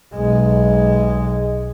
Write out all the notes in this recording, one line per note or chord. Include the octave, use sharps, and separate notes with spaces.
B1 G#3